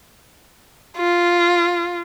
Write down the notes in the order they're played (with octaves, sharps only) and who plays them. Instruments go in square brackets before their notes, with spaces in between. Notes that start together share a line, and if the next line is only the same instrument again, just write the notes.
[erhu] F4